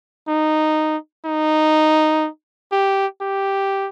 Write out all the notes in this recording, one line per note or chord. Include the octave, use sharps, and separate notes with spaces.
D#4
D#4
G4
G4